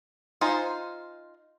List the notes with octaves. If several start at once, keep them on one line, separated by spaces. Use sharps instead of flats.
D#4 F4 C5 G#5